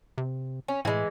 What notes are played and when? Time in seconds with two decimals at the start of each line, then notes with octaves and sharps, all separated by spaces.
0.18 C3
0.68 C#4
0.85 A2 E3 G#3